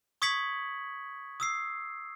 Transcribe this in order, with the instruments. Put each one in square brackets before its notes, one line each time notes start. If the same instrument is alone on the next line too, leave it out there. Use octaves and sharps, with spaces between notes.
[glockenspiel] C#6 D#6 G#6 B6 C#7 F#7
D#6 E6 C7